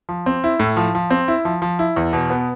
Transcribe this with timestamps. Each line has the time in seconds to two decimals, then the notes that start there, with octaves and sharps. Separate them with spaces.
0.09 F3
0.26 C4
0.44 E4
0.59 A2
0.77 F3
0.95 F3
1.10 C4
1.28 E4
1.45 F3
1.62 F3
1.79 E4
1.96 E2
2.13 B2
2.30 B3